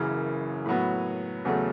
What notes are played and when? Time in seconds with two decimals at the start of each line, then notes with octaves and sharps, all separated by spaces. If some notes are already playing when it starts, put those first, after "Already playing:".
Already playing: F#1 F#2 C#3 E3
0.66 A2 F#3 B3
1.45 E2 C#3 F#3 A3